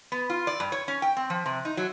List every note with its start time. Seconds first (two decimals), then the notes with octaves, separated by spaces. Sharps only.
0.12 B3
0.30 F4
0.47 D5
0.60 G2
0.72 C#5
0.88 C#4
1.02 G5
1.17 C4
1.30 F3
1.46 C3
1.65 D#4
1.77 F#3